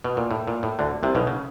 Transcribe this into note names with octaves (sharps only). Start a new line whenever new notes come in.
B2
A#2
A2
A#2
A2
D2 D3
C2 C3
B1 B2
C#3